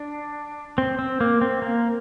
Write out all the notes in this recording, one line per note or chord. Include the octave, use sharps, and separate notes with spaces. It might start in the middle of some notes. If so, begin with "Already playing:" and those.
Already playing: D4
C4
C4
A#3
C4
A#3